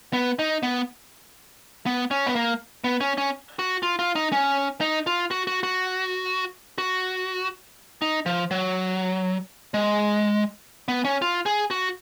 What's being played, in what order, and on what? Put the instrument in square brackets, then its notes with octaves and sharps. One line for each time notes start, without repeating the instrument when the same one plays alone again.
[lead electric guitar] B3
D#4
B3
B3
C#4
B3
A#3
B3
C#4
C#4
F#4
F4
F4
D#4
C#4
D#4
F4
F#4
F#4
F#4
F#4
D#4
F3
F#3
G#3
B3
C#4
F4
G#4
F#4